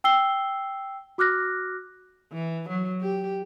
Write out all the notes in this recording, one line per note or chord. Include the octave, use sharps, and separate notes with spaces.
G5 E6 C7 G7
F#4 D6 F6 F#6 A#6
E3
F#3
G4